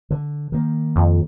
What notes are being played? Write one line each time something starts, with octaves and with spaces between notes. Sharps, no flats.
D3
D#3 A#3
F2